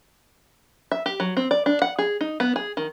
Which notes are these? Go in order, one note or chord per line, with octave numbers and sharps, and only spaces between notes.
E5
G4
F#3
C4
D5
D4
F#5
G#4
D#4
B3
G#4
D#3